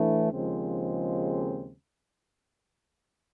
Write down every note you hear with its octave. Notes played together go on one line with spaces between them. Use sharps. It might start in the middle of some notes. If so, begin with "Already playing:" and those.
Already playing: A2 E3 A3 D4
D#2 C#3 F3 G#3 C4